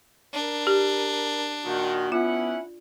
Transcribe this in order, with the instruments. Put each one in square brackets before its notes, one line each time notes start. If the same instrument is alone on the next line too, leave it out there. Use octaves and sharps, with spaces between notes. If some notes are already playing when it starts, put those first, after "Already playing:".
[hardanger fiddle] D4 [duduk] A#4
[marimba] G4
[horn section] A#2 D#3 [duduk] F#4
[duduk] B3 [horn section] C#4 E4 F#5 [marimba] F4